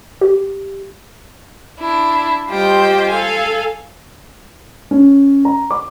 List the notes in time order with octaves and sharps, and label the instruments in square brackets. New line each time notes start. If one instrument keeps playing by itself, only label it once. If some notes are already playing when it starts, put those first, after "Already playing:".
[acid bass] G4
[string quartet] D4 E4
G3 F4 G4 C5 D#5 G5
A4 F5 G#5
[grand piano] C#4
A#5
D6